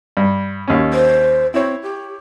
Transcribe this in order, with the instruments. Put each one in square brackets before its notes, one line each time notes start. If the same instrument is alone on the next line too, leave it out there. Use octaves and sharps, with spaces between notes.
[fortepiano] G2
D#2 C#4
[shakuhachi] C5
[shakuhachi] C4 [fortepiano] E4 C#5
[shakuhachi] G4